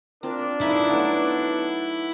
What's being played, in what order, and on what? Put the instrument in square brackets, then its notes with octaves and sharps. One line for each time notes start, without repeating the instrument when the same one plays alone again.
[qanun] C4 F4 [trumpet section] D4 [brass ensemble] A#4
[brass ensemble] G2 D3 F3 [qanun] D#4 B4 [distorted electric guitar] E4
[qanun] F#3 A3 [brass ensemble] B3 F#5